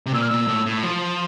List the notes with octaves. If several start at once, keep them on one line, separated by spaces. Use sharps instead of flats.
C3
A#2 E6
F6
A#2 E6
A2
A2
F3